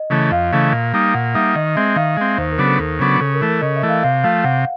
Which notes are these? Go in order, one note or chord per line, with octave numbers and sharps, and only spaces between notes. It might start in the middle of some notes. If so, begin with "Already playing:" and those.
Already playing: D#5
C#3 E3 A3
F2 F5
C#3 E3 A3
A#2
G3 A#3 D#4
A#2 F#5
G3 A#3 D#4 E5
D#3 D#5
G#3 C4 E5
D#3 F5
G#3 C4
D#2 C5
A#4
C#3 F#3 B3 D4
A4
D#2 A4
C#3 F#3 B3 D4
C#3 A4
A#4
E3 A3 A4
A#4
C#3 D#5
E5
E3 A3
F5
C3 F5
F3 A3 F5
C3 F#5